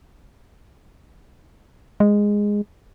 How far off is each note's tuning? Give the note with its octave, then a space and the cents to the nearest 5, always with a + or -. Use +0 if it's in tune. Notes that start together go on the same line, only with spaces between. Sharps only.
G#3 -10